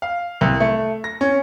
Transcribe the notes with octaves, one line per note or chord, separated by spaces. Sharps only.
F5
C2
A3
A#6
C#4